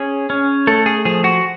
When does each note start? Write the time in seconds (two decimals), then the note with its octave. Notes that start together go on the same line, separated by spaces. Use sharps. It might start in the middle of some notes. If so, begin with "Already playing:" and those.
Already playing: C#4 G#4
0.30 C#4
0.67 A3 A4
0.86 G#4
1.05 F3 G#4
1.24 F#4